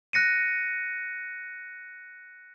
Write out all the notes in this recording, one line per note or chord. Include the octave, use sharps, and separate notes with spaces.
F#6 A#6 C#7 D#7